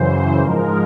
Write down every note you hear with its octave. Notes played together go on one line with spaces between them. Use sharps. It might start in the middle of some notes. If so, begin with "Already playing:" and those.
Already playing: F#2 C#3 E3 C5
G#2 F3 G#3 A#4